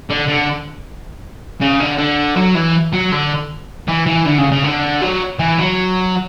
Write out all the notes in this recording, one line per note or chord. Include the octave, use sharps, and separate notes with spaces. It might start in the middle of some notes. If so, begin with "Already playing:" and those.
D3
D3
C#3
D3
D3
F#3
E3
F#3
D3
E3
E3
D3
C#3
C#3
D3
F#3
E3
F#3